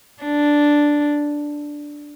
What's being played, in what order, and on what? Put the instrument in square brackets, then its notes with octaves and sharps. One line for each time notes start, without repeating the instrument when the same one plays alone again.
[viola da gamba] D4